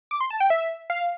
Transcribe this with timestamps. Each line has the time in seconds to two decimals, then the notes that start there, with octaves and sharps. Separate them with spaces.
0.11 D6
0.21 C6
0.30 A5
0.40 G5
0.50 E5
0.90 F5